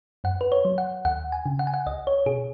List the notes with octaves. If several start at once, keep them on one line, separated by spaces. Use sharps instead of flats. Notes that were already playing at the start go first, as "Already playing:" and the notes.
F#2 F#5
B4
C#5
F#3
F#5
D#2 F#5
G#5
C#3
F#5
G#5
F#5
C#2 D#5
C#5
B2 G#4